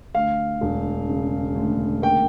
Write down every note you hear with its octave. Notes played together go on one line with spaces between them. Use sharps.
D2 F5
E1
C#3
D2
A#3 G5